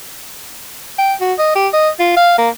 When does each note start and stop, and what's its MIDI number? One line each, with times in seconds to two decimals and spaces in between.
0.98 1.13 79
1.20 1.34 66
1.38 1.53 75
1.55 1.68 67
1.73 1.89 75
2.00 2.13 65
2.16 2.35 77
2.38 2.49 58